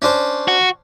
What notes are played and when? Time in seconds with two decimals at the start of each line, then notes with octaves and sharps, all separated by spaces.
0.02 C#4 D4 C5
0.48 F#4